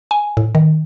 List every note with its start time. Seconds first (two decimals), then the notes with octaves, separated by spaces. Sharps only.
0.11 G#5
0.37 A2
0.55 D#3